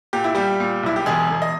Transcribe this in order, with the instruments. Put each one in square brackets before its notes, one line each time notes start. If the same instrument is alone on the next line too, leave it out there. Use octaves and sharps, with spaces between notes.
[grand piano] A#2 G4
E4
A#2 G3 G4
A#2
B1 E4
G4
E1 G#3 G#4
E1
D#5